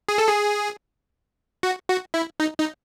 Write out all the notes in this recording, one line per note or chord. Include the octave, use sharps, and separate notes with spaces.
G#4
A4
G#4
F#4
F#4
E4
D#4
D#4